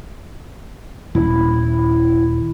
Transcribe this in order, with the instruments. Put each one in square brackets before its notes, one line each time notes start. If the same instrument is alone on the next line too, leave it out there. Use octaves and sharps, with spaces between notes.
[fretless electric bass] D#1 [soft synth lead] E4